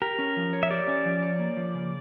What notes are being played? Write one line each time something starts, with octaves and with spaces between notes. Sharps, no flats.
G4 A#4
C#4
F3
C#5
E5
G4 D5
C#4
F3
C#5
A#3
F3
C#3